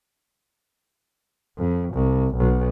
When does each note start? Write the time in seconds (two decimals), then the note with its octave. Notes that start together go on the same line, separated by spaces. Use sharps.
1.57 F2
1.94 C2
2.35 B1